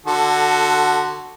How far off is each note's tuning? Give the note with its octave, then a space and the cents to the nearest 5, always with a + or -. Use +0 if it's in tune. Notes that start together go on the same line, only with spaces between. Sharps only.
D3 +20 F#4 +0 A4 +0